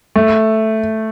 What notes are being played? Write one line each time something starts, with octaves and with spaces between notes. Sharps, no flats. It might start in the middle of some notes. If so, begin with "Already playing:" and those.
A3